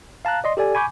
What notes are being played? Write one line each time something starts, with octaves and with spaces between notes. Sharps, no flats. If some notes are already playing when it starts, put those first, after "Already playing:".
F5 A5 A#5 F#6
D5 D#5 C6
G4 A4 D5 G#5
G#5 B5 C#6 D6 G6